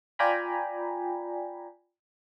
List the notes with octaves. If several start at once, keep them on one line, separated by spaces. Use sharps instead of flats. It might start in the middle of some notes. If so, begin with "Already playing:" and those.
F4 D5 G5 G#5 A#5 B5